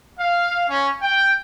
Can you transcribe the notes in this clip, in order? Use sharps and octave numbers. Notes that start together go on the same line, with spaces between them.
F5
C#4
G5